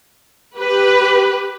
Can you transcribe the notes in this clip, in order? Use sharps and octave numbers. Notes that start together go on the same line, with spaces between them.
G4 B4